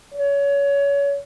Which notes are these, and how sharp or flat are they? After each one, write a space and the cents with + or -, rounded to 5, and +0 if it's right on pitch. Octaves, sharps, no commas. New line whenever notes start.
C#5 +25